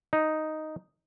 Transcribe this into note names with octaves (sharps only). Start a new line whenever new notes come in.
D#4